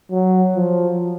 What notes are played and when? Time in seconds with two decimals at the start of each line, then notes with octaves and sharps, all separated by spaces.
0.11 F#3
0.56 F3